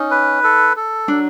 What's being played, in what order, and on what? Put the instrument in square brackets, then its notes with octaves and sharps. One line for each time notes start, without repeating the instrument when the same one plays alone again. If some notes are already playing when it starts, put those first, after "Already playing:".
Already playing: [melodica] C#4 [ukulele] D#4
[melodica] B4
A4
A4
[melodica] F#3 [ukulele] D4